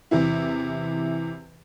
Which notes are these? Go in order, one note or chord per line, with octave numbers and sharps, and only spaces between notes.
E2 C3 E3 E4